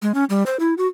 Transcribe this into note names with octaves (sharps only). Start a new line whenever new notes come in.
G#3
C#4
G3
C5
E4
F#4